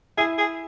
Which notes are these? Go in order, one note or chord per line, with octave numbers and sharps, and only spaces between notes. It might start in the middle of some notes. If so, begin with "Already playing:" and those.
E4 G#4
G#4